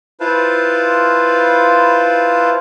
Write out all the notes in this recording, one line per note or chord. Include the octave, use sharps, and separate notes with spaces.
E4 F4 B4 C5 F5 A5